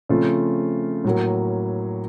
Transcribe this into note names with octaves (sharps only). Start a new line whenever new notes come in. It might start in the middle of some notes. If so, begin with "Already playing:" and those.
C#3 F3 A3 C4 F4
A2 F#3 A#3